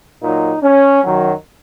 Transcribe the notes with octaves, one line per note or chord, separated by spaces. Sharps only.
A#2 F#3 D#4
C#4
F#2 D#3 F#3